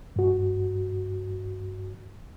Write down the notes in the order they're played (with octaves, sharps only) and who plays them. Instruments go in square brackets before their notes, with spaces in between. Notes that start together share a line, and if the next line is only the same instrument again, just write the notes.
[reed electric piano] G2 F#4